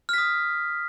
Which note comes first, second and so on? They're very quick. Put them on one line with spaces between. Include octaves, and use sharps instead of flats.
F6 B6 D#6